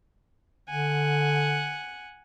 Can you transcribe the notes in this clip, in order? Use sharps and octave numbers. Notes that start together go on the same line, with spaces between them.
D3 F#5 G#5